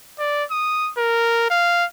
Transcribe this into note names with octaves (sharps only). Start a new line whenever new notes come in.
D5
D#6
A#4
F5